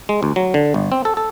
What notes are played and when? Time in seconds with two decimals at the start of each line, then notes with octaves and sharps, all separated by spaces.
0.09 G#3
0.23 D2
0.36 F#3
0.54 D3
0.74 G1
0.92 C4
1.05 A4
1.17 A4